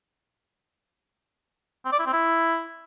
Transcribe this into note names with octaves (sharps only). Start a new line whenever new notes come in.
C4
D5
E4
C4
E4